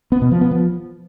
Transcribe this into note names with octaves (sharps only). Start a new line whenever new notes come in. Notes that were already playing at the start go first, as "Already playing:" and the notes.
B3
B2
F3
B3
F3